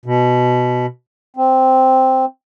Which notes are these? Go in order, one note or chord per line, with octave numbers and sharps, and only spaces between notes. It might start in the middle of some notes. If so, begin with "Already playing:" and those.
B2
C4